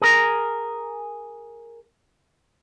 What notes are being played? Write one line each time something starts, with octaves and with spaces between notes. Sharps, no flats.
G#4 A#4